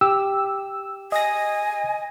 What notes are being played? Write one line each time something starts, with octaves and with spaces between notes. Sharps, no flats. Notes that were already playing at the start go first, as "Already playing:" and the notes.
G4 E6
D#5 G#5 A#6